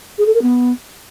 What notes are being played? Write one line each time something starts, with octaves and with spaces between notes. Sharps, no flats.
G#4
A4
A#4
B3